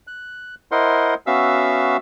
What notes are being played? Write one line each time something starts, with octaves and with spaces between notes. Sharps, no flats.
F#6
E4 A#4 C5 D#5 F#5 C6
B3 C#4 F#4 E5 F5 E6